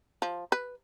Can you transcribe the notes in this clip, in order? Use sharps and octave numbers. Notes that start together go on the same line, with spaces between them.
F3
B4